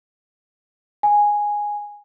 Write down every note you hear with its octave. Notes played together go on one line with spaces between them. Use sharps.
G#5